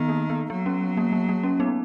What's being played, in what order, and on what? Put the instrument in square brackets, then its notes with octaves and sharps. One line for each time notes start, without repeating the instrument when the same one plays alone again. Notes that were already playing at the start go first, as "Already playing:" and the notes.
Already playing: [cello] D#3 [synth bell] B3
[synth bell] A#3
B3
[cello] F#3 [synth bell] B3
[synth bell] C#4
A#3
A#3
A#3
C#4
B3 D#4